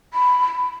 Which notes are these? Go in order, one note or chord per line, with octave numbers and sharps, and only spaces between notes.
B5